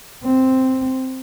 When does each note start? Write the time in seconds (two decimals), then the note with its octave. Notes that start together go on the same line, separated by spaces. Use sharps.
0.24 C4